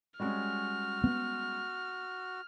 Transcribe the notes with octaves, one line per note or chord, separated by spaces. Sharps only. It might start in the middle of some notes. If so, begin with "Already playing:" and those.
G3 G#3 C#4 F#4 F6
B3